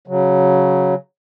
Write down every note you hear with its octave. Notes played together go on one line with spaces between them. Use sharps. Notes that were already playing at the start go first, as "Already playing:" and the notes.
C#3 F#3